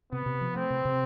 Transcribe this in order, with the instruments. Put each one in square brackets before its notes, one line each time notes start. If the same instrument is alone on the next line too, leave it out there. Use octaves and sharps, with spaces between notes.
[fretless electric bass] C3 [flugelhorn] B3
[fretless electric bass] C3
F3
[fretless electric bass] A3 [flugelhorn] C4
[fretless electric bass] C3
C3